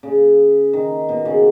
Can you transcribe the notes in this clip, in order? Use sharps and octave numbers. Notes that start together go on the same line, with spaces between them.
C#3
D#3
B2
C#3